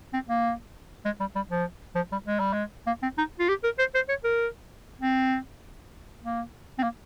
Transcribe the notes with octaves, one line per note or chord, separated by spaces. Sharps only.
C4
A#3
G#3
G3
G3
F3
F3
G3
G#3
G3
G#3
A#3
C4
D#4
F4
G4
A#4
C5
C5
C#5
A#4
C4
A#3
C4
A#3